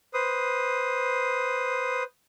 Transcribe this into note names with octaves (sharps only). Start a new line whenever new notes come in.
B4 C5 D#6